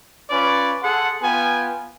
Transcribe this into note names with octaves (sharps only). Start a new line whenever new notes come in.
C#4 F4 B4 C#5 D5
G#4 A4 F#5 A5 C6
B3 F4 G5 G#5